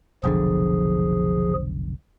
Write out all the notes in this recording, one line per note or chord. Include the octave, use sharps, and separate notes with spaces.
F1 B1 D3 F3 G#4